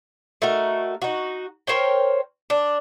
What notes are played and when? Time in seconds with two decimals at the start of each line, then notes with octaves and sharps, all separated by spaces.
0.42 A3 D#4 F#4 A#4
1.02 D#4 F#4
1.67 A#4 C5 C#5 G5
2.50 D4